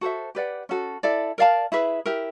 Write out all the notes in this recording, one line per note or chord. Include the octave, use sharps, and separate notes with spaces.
F#4 A4 C5 E5
G4 B4 D5 F#5
C#4 F#4 A4
E4 A4 D5
A#4 D5 F5 A5
E4 G#4 B4 E5
E4 G4 A#4